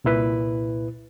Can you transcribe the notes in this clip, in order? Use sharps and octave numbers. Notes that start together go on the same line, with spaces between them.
C2 A#2 E4 B4